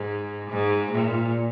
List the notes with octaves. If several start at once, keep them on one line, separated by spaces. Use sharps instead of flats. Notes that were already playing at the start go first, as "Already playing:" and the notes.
Already playing: G#2
G#2
A#2